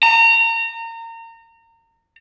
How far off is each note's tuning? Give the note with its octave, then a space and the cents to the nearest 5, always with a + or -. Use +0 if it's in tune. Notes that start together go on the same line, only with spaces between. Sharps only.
A#5 -30